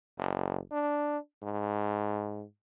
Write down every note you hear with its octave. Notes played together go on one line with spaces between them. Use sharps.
F#1
D4
G#2